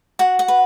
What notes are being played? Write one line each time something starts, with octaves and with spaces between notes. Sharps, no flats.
F#4 F#5
F#5
B4